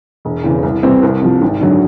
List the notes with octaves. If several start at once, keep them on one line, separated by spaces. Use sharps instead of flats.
E1
E2 C#3 E3
C2
C3 E3 G3 C4
C2
C3 F3
G#1
F#2 D3 F#3